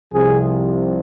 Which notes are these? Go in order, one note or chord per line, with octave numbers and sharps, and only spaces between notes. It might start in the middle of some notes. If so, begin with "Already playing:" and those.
C2 C3 F3 G#4